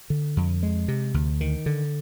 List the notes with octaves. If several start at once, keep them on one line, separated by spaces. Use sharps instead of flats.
D3
F2
G#3
C3
D2
D#3
D3